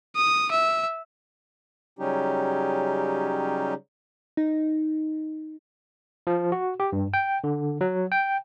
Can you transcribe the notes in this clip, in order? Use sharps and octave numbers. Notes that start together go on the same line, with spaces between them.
D#6
E5
C#3 F#3 G3 C#4 D#4 G4
D#4
F3
F#4
G4
G2
G5
D3
F#3
G5